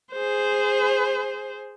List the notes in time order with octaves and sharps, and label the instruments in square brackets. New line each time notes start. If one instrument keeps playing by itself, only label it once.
[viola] G#4 C5